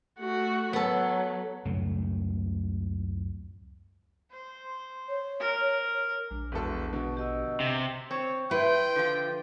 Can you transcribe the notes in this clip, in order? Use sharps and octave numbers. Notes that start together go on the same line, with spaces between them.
A3 F#4
F#3 B3 A4
C#2 F#2 A2 A3
C5
C#5
A#4
A#1 G#3 D4
E1 B2 A4
B2 D3
G4 D#5 E6
C3
C4 C#5
E4 B4 G5 C6
D3 F3 F4